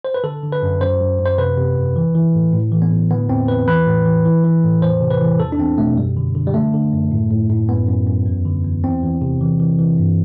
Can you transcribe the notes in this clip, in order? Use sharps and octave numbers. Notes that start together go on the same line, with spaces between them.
C5
B4
D3 A4
D3
B4
F#2
F#2 C5
F#2
F#2
C5
C3 B4
C3
E2
E3
E3
A2
A2
E3
B3
A2
D3 B3
E2 C4
E2 B4
E3 B4
A2
E3
E3
E3
A2
E2 C5
C3
B4
E3
E2 A4
D4
E2 C4
B2 A3
F#2 G3
D3
D3
G3
D3 A3
D3
F#2
A2
A2
A2
F#2 B3
F#2
F#2
E2
D3
E2
E2 C4
E2
C3
E3
E3
E3
G2